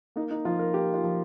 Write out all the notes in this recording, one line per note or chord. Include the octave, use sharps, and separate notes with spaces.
A#3 D#4
D#4
F3 F4
A#4
A#3 G4
F4
F3